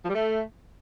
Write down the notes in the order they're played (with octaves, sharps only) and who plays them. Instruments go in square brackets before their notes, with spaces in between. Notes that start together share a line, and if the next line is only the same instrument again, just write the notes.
[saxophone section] F3
G3
A3